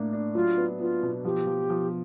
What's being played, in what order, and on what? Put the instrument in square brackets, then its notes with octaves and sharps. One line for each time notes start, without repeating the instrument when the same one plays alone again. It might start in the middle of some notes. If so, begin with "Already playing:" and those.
Already playing: [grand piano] A2 A#3 D4
D4
[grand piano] F#3 [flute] F4
[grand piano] B3
[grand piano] B3 [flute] F4
[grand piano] B2
[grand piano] F3 [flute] G4
[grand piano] F3
F3